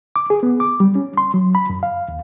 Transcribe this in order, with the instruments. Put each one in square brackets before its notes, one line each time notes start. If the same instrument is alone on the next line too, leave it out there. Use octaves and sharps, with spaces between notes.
[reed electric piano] D6
G#4
B3
D6
G3
C#4
C6
F#3
B5
F#2
F5
D#2